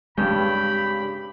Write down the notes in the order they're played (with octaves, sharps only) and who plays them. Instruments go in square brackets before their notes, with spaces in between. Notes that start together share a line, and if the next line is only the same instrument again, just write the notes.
[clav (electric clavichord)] G2 C#3 [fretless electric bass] G#3 C4 [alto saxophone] G4 [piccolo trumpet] B5